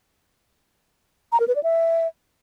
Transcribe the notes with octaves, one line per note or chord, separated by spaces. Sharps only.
A#5
A#4
B4
D5
E5